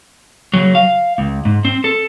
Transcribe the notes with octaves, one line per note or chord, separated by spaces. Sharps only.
C#3 F#3
F5
C#2
G#2
C4
A4